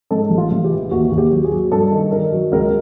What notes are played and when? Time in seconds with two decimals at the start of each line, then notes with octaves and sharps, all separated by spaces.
0.11 G#2 A4
0.30 A1
0.38 F4
0.51 A1
0.64 G4
0.71 E3
0.91 D#2 F#4
1.11 D#2
1.18 G4
1.31 F#3
1.44 G#4
1.52 F#3
1.72 G2 A4
1.92 D#3
2.12 D#3 A#4
2.33 F#3
2.52 C#2 A#4